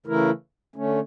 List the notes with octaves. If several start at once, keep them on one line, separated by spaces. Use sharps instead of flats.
C#3 E3 A3 E4 A#4
D3 A3 C#4